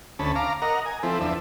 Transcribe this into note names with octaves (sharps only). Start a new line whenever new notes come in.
D2 C#4 A5 B5
F5 A#5 D6
A#4 D#5 F#5 A#5
G#5
F3 C4 E4 A4
E2 F3 D4 E5